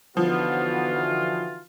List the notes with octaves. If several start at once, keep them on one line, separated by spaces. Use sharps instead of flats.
D3 E3 F3 B3 D#4 F4 F#4